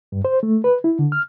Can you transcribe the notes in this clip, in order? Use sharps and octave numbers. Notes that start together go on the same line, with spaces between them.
G2
C5
A3
B4
E4
D3
F6